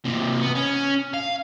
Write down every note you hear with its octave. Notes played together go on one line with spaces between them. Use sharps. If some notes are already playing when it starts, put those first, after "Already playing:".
C3 A#3
B3
C#4
F5